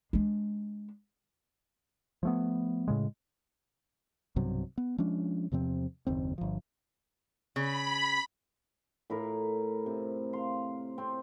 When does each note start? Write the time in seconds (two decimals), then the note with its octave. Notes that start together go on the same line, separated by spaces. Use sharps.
0.13 G#3 D4
2.23 F3 A3 B3
2.88 A2 C#3 G#3
4.36 B1 G2 C3 F#3
4.78 B3
4.98 F3 G#3 C#4 D4
5.52 E2 C3 F3 C4
6.07 F#1 D#2 C4
6.38 G1 F3
7.56 C#3 B5
9.10 A2 E4 A#4
9.86 C3
10.33 F5 C6
10.98 C4 C#5